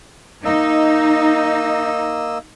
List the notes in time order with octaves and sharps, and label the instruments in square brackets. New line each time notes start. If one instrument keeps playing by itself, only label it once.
[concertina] A#3 D#5 E6 [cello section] D#4